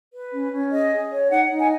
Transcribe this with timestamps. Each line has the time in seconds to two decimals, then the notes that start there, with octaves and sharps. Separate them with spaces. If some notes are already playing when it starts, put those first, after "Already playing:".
0.12 B4
0.32 C#4
0.52 C#4
0.71 G#4 D#5
0.91 G#4
1.11 C#5
1.30 D#4 F#5
1.49 D#4
1.59 G#5